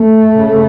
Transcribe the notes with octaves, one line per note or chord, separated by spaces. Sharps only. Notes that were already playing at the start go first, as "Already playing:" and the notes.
Already playing: A3
C#3